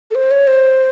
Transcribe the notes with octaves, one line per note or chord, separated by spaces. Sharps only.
A4
C5
C#5
C5